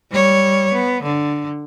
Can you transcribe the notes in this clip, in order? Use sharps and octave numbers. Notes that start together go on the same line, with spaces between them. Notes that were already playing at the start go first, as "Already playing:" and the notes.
G3 C#5
B3
D3